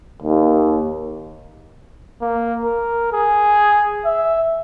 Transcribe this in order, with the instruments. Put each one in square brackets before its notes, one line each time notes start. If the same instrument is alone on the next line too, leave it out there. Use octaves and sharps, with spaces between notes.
[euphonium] D#2
[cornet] A#3
A#4
G#4
E5